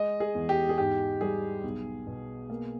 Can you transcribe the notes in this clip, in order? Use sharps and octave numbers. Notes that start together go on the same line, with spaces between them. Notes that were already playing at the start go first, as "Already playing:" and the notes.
Already playing: G#3 D#5
G#4
E2
G4
G#4
G#2 G4
G3 G#4
B1
B2
A#3